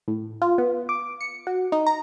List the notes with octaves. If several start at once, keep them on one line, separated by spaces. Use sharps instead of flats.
A2
F4
B3
D6
C#7
F#4
D#4
A#5